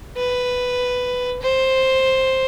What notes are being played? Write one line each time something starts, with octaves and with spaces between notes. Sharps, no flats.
B4
C5